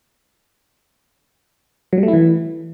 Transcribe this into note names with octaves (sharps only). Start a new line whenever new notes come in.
F#3
G3
A3
E4
E3